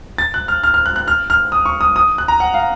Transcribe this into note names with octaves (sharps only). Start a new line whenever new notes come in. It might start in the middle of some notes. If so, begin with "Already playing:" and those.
A6
F#6
F6
F6
F6
F#6
F#6
F6
F6
D#6
C#6
D#6
D#6
F#6
A#5
F#5
F5